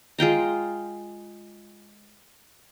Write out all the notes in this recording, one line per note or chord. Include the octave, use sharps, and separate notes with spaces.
G#3 F4 G5 A#5